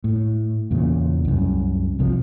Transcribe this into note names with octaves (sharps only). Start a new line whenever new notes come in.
A2
E2 A#2 C#3
C2 F#2
B1 C3 F3